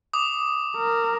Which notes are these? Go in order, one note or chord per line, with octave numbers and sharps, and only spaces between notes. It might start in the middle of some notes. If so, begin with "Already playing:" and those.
D6 D#6
A#4